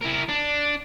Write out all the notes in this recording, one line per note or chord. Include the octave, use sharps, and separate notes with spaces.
E4 A#4
D4